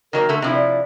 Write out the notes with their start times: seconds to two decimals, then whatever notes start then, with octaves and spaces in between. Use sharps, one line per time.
0.13 D#3 F#3 A#3 A#4
0.29 D3 A3
0.42 C3 F3 D4 E4
0.54 D5